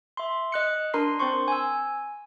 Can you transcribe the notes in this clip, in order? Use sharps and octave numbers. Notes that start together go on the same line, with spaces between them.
E5 C6
D#5 F#6 C#7
D4 A#4 A#5 C6 C7
C4 C5 C6 C#6
G#5 E6